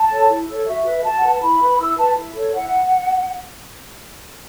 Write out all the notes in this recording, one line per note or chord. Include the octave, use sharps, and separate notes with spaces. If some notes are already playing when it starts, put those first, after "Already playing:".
Already playing: A5
A4 C#5
E4
A4 C#5
F#4 E5
B4
F#4 A5
B4 F#5
A5
E4 B5
B4
E4 E6
B4 A5
E4
A4 C#5
E4 F#5